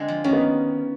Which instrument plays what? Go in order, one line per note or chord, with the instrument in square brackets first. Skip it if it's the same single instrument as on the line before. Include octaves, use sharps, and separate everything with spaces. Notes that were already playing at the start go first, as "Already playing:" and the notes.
Already playing: [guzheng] D3 G#3 C4
F3
[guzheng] D#3 [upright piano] C#4
[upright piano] B3